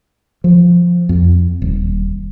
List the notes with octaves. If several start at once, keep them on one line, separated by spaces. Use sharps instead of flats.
F3
F2
D#1